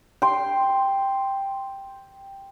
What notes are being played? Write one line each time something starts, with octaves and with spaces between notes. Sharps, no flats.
G5 C6